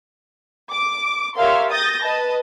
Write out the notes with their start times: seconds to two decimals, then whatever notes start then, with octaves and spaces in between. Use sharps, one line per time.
0.71 D6
1.37 G4 A#4 C#5 E5 F5 C6
1.72 D#6 G6 A6 A#6
2.04 B4 D#5 A5